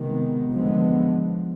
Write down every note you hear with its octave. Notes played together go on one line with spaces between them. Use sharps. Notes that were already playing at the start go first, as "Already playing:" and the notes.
Already playing: C3 D#3 G#3 B3
D3 F3 G#3 B3